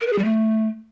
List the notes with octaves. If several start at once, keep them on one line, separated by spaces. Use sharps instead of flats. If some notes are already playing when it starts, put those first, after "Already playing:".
A#4
B4
G#4
G3
A3